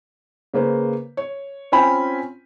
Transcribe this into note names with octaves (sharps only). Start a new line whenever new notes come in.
C#3 A#3 B4 C5
C#5
C4 C#4 F4 G5 G#5 B5